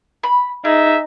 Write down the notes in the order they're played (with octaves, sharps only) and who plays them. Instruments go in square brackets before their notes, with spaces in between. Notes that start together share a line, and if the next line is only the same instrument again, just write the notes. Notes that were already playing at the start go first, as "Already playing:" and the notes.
[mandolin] B5
[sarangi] D#4 [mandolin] G#4 [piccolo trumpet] E5